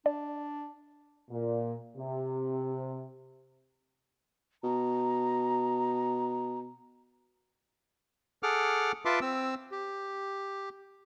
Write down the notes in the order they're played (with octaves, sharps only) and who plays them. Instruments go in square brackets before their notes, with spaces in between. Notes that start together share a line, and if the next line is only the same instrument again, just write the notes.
[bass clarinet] D4 [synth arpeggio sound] D5
[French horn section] A#2
C3
[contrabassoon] B2 [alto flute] A#5
[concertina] G#4 A4 F#5 D6 F6
F4 B4 E5 A5 C6 D6
C4 E6
G4